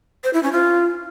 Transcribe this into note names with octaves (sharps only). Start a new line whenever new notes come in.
C5
E4
C#4
F4